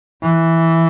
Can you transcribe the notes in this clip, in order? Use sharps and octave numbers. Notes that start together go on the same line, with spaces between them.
E3